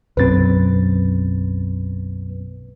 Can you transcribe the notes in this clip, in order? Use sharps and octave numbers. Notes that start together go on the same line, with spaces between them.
B1 F#2 C4 B4 A6